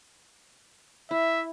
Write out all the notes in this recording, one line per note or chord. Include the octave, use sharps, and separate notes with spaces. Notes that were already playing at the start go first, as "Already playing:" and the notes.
E4 E5